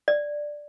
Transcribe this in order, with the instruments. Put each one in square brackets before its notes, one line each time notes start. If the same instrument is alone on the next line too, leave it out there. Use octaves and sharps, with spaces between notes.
[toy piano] D5